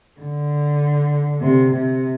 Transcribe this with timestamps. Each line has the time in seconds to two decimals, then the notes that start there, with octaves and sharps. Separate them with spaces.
0.20 D3
1.41 C3
1.72 C3